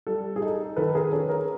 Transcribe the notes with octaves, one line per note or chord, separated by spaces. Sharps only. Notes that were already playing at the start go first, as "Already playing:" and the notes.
G3 A4
G#4
D#4 A4
D#3 A4 B4
G#4 A#4
C#4 A4 B4
G#4 A#4